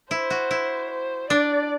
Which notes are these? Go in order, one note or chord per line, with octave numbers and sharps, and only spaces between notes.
E4 C5
F#4
E4
C5
D4 D5